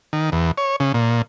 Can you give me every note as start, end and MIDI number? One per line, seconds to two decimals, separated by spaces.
0.13 0.30 51
0.32 0.51 40
0.58 0.76 73
0.80 0.92 49
0.94 1.22 46